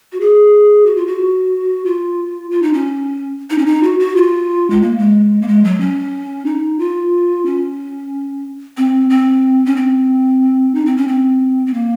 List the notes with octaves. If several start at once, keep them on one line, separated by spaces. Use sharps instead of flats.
F#4
G#4
F#4
F4
F#4
F4
F4
D#4
C#4
D#4
C#4
D#4
F#4
F#4
F4
G#3
A#3
G#3
A#3
G#3
F#3
C#4
D#4
F4
C#4
C4
C4
C#4
C4
D#4
C4
C#4
C4
C4
A#3